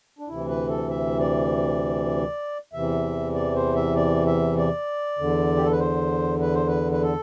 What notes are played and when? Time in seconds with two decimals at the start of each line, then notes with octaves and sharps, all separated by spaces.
0.19 D4
0.28 D2 C3 E3 E4
0.48 B4
0.69 A4
0.90 E5
1.20 D5
2.73 E2 C3 E3 E5
3.35 D5
3.55 C5
3.75 E5
3.96 D5
4.27 E5
4.57 D5
5.19 E2 D3
5.56 G4
5.64 A4
5.72 B4
5.79 C5
6.41 B4
6.54 C5
6.67 B4
6.92 B4
7.02 A4